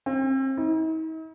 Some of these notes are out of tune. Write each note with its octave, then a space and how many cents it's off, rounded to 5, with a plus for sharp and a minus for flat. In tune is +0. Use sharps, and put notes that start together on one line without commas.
C4 +35
D#4 +45